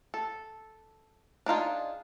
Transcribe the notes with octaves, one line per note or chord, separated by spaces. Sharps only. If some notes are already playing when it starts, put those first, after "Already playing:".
A4
D4 D#4 F4 G#4